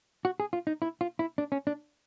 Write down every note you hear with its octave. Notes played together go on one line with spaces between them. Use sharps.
F#4
G#4
F4
D#4
E4
F4
E4
D4
C#4
D4